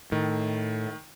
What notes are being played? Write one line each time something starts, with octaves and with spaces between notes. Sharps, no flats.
A2 D#3